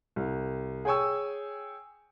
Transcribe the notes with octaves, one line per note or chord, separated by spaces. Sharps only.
C2
G#4 C#5 G5 G#5 C#6 E6